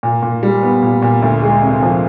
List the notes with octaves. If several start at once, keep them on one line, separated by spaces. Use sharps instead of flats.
A#2
A#2
G3
B3
A#2
A#2
D2
G#3
C3
F3